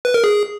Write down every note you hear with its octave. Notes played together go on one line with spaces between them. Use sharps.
B4
A#4
G#4